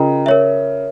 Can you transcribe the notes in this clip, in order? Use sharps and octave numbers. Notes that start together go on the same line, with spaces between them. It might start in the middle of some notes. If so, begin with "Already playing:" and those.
Already playing: C#3 F4 A#4 D#5 G5 A#5
A#4 C#5 E5